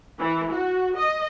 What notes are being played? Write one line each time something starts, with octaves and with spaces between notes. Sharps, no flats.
E3
F#4
D#5